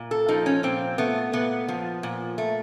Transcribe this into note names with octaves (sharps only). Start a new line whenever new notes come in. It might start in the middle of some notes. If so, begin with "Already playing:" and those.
Already playing: A#2
A4
F3 D#4
C#4
A#2 C4
A3 B3
A#2 B3
F3
A#2
A3